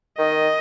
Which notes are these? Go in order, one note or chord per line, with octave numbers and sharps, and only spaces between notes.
D#3 D#5